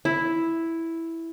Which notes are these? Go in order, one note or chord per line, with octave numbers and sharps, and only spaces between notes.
E4